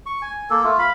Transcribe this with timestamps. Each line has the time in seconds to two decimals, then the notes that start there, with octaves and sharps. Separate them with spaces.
0.06 C#6
0.22 G#5
0.50 A#3 A4
0.64 A3 F4
0.79 F5 B5